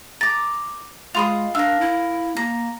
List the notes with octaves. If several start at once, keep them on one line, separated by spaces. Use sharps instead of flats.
A#5 D6 A6
G#3 F4 G#4 B5 C6 D#6 F7
D4 A#4 F5 E6
E4
A#3 A#5